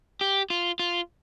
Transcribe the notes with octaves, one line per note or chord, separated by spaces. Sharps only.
G4
F4
F4